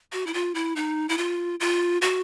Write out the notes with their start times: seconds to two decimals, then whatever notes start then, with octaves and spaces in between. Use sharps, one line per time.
0.13 F#4
0.27 E4
0.34 F4
0.55 E4
0.76 D#4
1.09 E4
1.18 F4
1.60 F4
2.02 F#4